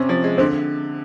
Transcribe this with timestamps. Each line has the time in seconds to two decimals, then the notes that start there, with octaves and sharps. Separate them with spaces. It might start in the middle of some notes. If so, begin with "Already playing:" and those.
Already playing: C3 C4 C#4
0.09 F3
0.24 G#3
0.38 D3 C4